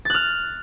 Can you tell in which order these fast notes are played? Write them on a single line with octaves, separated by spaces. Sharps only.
A6 F#6 F6